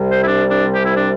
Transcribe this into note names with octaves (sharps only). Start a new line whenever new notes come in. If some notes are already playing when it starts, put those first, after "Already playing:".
Already playing: C2 C3 G3
C5
E4
D4
D4
G4
E4
D4